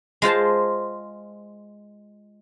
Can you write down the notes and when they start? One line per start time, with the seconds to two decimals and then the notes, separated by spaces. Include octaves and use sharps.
0.22 G#3 F4 C5 A5